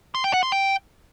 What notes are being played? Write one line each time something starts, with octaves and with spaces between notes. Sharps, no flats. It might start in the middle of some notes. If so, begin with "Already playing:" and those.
C6
G5
F#5
C6
G5